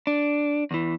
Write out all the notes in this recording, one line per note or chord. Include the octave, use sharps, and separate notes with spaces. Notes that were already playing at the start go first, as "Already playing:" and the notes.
D4
E2 E3